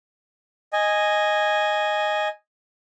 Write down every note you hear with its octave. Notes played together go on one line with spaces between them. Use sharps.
D#5 G#5